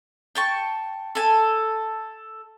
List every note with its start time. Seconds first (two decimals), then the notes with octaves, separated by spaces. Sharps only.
0.35 G5 A5 C#6
1.15 A4 G#5